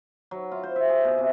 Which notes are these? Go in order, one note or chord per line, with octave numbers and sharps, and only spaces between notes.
F#3
F4
C5
E5
G#4
B2
C3